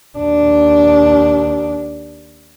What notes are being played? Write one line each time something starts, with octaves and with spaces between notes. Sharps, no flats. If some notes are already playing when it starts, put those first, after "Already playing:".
D#2 D4